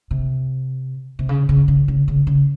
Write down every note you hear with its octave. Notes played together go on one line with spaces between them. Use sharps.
C3
C3
C#3
C#3
C#3
C#3
C#3
C#3